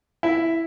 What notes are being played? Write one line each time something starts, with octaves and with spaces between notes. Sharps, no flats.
E4